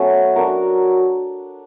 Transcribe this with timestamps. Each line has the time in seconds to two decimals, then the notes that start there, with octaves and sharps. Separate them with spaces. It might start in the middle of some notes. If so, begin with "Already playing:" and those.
Already playing: F#3 A3 B3 C#4 F#4
0.36 D4 F#4 A#4